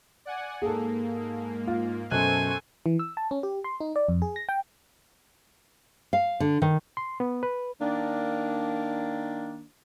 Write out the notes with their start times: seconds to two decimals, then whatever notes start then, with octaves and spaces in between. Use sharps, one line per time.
0.25 D5 F#5 G#5
0.62 G#2 A#3 G#4 A4
1.67 F4
2.11 F#2 B2 A4 C5 G#5 C#6 F#6
2.86 E3
2.99 E6
3.17 A5
3.31 C#4
3.43 G4
3.64 C6
3.81 D#4
3.96 D5
4.09 F2
4.22 G#4
4.36 A#6
4.49 G5
6.13 F5
6.40 D3
6.62 D#3
6.97 C6
7.20 B3
7.43 B4
7.80 D#3 A#3 D4